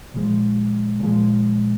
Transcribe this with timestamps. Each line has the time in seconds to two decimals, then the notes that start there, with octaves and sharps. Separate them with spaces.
0.14 A#2 F3 G#3
1.00 A#2 F3 G#3